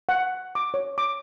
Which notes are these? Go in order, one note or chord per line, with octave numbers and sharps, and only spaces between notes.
F#5
D6
C#5
D6